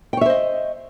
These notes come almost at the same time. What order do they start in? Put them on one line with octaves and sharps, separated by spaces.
G5 C#5 E5 C5 D#5